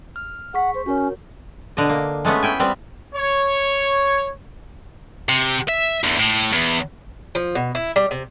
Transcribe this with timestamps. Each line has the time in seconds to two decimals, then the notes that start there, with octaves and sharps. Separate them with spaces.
0.16 F6
0.54 G#4 F#5 C#6 B6
0.74 C5
0.86 C#4 F#4 A#4 C#5
1.77 B2 D3 D#5
1.89 A#3
2.25 G#3 A3 B3 C#4
2.43 E4 G5 G#5
2.59 G3 B3 C4
3.14 C#5
5.29 C3
5.69 E5
6.04 E2 D3
6.19 A2
6.53 E2
7.35 F3
7.55 B2
7.75 E4
7.96 G3
8.11 C3